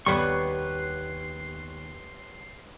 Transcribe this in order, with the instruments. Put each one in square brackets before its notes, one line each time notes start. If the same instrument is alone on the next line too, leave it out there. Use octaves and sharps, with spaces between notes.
[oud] D#2 B3 [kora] G3 [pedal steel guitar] B4 C#5 C#6 [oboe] C6